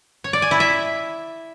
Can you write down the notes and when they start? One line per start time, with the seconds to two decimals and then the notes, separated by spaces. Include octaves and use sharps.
0.24 C#5
0.33 D5
0.42 G#5
0.51 E4
0.60 E5